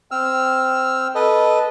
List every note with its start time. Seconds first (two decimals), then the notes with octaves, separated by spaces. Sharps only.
0.11 C4 E6 F6
1.15 A4 B4 D#5